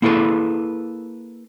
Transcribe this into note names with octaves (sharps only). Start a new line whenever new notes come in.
A#3 E4 G#4 A4 B4